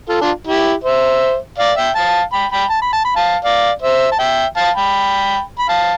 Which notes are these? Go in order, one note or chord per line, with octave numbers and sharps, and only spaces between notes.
F4 A4
D4 F4
E4 G4
C5 E5
D5 F5
E5 G5
F5 A5
G5 B5
G5 B5
A5
B5
A5
B5
F5 A5
D5 F5
C5 E5
A5
E5 G5
F5 A5
G5 B5
B5
F5 A5